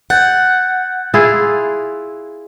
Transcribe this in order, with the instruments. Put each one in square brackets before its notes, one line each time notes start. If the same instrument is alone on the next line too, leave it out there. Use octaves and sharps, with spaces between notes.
[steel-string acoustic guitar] F#5 [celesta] F#6 G6 A6
[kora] E4 F4 G#4